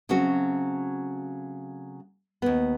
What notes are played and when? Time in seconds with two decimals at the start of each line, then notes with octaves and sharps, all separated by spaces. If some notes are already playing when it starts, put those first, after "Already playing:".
0.09 C#3 F#3 A3 C4 F#4
2.42 D#2 B3